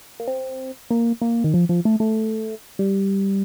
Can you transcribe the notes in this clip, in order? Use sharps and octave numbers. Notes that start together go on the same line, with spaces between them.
A#3
C4
A#3
A#3
D#3
F3
F3
A3
A3
G3